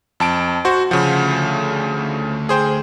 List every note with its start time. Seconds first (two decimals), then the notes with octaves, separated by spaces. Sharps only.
0.20 F2 A5 D7
0.65 F#4 C5
0.91 D2 C#3 F3 F#5
2.49 G#4 C5 G5